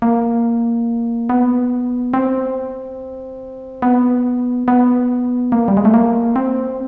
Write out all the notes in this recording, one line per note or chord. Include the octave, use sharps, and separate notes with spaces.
A#3
B3
C4
B3
B3
A#3
G3
G#3
A3
A#3
C4